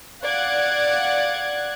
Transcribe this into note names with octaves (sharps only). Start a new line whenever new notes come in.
D5 F5 F#5 F#6 G#6